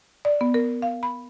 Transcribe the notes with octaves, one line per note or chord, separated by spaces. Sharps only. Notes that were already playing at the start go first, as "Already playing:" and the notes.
D5
B3
A#4
F5
B5